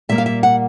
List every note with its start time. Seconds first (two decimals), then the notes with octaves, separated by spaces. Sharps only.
0.09 A#2 G3 A#3 E5
0.18 F5
0.26 E5
0.43 F#5